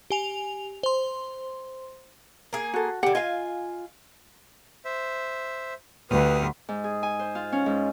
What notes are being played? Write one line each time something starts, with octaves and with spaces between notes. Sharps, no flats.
G4 G#5 F7
C5 C6
A#3 G#4
F#4 A4
D3 G3 F#5 G5
F4 D#5 F5 G#5
C5 E5
D2 G4 B4 D#6 F6
G#2
G#4
G#5
C5
F4
C#4
G#2